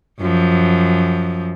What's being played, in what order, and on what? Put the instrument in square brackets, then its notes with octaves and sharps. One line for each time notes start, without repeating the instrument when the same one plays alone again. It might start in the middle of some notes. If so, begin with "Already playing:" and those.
[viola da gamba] F#2 F3